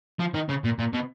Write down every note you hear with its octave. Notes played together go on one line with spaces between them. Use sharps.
F3
D#3
C#3
A#2
A#2
B2